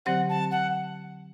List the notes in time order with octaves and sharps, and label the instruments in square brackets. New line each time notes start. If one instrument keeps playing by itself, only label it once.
[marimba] D3 F#3 C4 G4 C5 [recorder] F#5
[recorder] A5
F#5